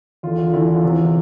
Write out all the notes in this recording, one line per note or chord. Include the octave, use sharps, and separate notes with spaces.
E2 D3 F4
F4
E2 D3 E4
F4
E2 C3 E3